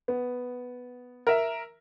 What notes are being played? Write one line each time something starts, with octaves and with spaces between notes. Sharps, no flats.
B3
A#4 E5